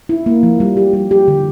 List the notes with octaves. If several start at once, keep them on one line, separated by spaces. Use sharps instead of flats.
E4
A#3
F3
G3
G4
G3
G4
D3